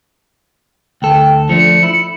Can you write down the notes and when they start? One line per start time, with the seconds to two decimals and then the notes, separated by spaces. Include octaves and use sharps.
1.02 D2 A4 G5
1.49 F3 A3 D4 C#7
1.83 E4